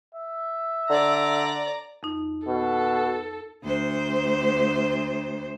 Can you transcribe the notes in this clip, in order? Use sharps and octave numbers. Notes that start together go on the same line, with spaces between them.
E5
D3 D5 A#5
F2 D#4
B2 A4
D2 C5